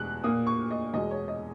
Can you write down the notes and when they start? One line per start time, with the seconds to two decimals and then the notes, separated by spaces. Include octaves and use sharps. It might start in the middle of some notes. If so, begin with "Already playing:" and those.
Already playing: E2 B2 G#3 F#6
0.24 A#2 A#3 D#6
0.47 C#6
0.71 D#5
0.93 E2 B2 G#3 D#5
1.11 C#5
1.28 D#5